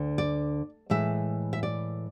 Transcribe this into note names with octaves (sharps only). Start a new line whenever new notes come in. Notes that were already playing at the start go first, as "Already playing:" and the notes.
Already playing: D2 D3
D5
A2 E3 G#3 E5
E5
D5